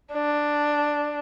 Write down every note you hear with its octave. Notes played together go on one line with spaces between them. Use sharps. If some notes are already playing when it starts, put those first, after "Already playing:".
D4